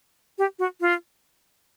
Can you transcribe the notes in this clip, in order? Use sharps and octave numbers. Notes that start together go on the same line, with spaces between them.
G4
F#4
F4